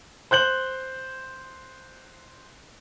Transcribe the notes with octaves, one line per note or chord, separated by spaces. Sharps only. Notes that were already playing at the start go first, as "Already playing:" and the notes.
C5 F#6 G6 F#7